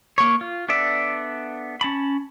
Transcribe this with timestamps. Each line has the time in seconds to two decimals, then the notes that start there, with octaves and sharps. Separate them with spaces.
0.18 A#3 C#5
0.41 F4
0.69 B3 D4 A4 D5 E5
1.81 C#4 A5 B5